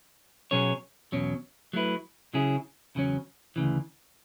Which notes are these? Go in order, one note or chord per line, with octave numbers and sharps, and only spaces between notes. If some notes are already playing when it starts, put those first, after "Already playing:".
B2 F#3 C#4 G#4 C#5
E2 B2 F#3 C#4
F#3 A3 E4 B4
C#3 F#3 C#4 E4 G#4
E2 C#3 F#3 C#4
D2 C#3 E3